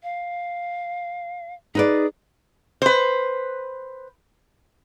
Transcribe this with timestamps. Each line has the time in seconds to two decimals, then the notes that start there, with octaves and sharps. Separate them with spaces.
0.03 F5
1.75 D#4 G#4 B4 D5
2.82 B4 C5